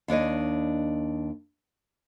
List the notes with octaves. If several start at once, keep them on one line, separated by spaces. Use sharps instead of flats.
D#2 D4 C#5 D#5